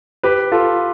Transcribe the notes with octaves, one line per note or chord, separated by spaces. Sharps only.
G4 B4
F4 A4